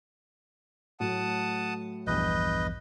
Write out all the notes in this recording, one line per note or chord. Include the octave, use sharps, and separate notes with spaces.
A2 F#3 A3 F#5 A5 D#6
A#1 E2 G2 B4 D#5 G6